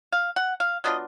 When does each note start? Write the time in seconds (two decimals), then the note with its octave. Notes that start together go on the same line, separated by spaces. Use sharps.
0.12 F5
0.36 F#5
0.60 F5
0.84 F#3 B3 D4 F4 D#5